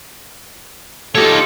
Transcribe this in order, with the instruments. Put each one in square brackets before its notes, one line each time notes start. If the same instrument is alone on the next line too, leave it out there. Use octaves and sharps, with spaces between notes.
[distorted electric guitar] D#4 C#5 [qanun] F4 G4 F5 [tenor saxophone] A4